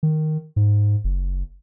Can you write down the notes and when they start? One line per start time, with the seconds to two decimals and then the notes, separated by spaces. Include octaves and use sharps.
0.03 D#3
0.56 G#2
1.04 F#1